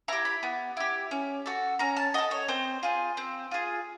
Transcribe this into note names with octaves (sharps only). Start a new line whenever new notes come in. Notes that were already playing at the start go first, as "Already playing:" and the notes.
E4 G4 A#5
B5
B3
E4 G4
C#4
F#4 A4
C#4 A#5
A5
F#4 A4 D#5
C#5
C4 C5
F4 G#4
C4
F4 G#4